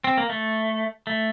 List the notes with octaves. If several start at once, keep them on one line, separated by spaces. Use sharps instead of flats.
C4
A#3
A3
A3